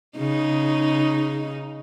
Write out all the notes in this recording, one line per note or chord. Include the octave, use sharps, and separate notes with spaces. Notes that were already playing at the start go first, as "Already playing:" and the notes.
C#3 D#4